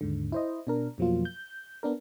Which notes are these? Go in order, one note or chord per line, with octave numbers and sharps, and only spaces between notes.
D#2 G#2 D3
E4 C5 D#5
B2 D4 A#4
F2 B2 F3 F#3 A#3 F4
G6
B3 D4 A#4